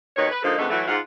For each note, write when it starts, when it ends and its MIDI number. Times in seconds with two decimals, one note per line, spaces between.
0.17 0.29 39
0.17 0.29 47
0.17 0.29 63
0.17 0.29 71
0.17 0.29 73
0.30 0.42 71
0.43 0.57 50
0.43 0.57 53
0.43 0.57 56
0.43 0.57 58
0.43 0.57 63
0.43 0.57 69
0.58 0.67 41
0.58 0.67 44
0.58 0.67 57
0.58 0.67 59
0.58 0.67 62
0.58 0.67 63
0.70 0.84 52
0.70 0.84 54
0.70 0.84 57
0.88 0.98 44
0.88 0.98 65
0.88 0.98 78